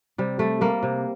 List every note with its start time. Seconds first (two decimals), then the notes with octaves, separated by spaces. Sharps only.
0.18 C3 G3
0.39 G3 A3
0.61 G3 A#3
0.83 C3